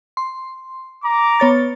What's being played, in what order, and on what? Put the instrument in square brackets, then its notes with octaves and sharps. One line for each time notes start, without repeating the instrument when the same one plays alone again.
[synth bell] C6
[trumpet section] A#5 D6
[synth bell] B3 C#5 A6